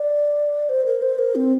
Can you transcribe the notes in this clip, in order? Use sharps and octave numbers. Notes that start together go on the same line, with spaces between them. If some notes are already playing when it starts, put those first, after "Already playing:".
Already playing: D5
C5
A#4
C5
A#4
C4